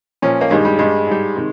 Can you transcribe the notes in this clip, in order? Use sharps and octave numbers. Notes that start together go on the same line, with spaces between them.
A#2 F3 C#4
A#3
G2 D#3 G3 G#3
G3
G2 G3 G#3
G#2 G3
C3 D#3